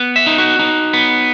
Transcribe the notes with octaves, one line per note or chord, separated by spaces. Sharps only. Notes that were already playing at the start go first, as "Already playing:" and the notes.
Already playing: B3
E5
D#4
F#4
D#4
B3